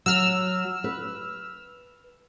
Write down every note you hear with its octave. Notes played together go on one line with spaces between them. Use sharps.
F#3 E6 F6
B4